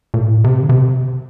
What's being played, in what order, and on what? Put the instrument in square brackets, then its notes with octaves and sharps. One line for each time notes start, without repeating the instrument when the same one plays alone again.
[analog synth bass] A#2
A2
C3
D3
C3